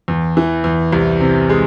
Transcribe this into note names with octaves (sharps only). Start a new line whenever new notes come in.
E2
E3
E2
C2
C3
G#3